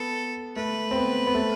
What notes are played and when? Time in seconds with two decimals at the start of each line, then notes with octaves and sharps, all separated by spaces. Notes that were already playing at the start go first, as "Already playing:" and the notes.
Already playing: B3 A4
0.56 A3 B4
0.91 C4
0.96 B3
1.27 B3
1.34 A3